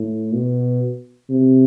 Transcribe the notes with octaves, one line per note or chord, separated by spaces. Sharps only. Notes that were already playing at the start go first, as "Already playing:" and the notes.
Already playing: A2
B2
C3